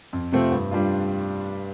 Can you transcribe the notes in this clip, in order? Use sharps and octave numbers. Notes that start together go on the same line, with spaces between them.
F2
C3 A3 C4 F4
G2
G3 D4 F4